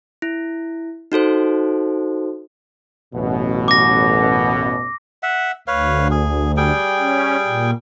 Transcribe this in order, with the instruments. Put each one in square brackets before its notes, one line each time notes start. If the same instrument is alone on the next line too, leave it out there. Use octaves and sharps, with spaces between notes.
[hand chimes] E4
D#4 F#4 A4 C5
[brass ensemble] A1 F#2 B2
[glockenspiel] D6 A#6
[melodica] E5 F#5
[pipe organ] D2 [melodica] B4 C#5 F5
[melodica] G#4
G3 G#4 G5
[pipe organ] C#4
A#2